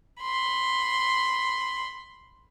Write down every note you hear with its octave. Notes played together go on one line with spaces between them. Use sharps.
B5 C6